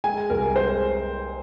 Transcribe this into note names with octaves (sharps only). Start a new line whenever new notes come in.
G#3 G#5
C2 A#4
G#3 C5